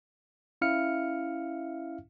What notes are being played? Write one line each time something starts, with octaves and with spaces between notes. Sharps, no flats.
C#4 E4 E5 F5 F6 C#7